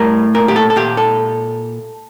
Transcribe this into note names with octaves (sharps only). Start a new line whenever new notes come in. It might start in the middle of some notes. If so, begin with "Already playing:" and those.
Already playing: A2 G3 A#4
A#2 A#4
G4
A4
A4
A#2 G4
A4